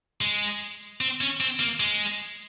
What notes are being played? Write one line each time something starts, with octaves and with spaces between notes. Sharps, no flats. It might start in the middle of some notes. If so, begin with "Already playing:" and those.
G#3
C4
C#4
C4
A#3
G#3